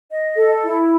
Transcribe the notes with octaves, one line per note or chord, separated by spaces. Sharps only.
D#5
A4
E4